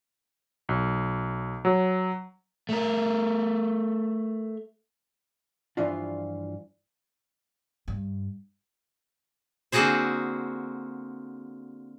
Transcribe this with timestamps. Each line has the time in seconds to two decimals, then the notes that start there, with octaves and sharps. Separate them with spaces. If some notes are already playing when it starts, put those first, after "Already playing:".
0.69 B1
1.65 F#3
2.69 A3 A#4
5.77 G2 E3 F3 D4 F4
7.88 G2
9.72 D3 A#3 C4 F#4 G#4 C5